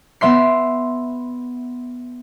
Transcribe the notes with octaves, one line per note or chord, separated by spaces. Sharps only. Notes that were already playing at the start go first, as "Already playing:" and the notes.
B3 E5 C6 C7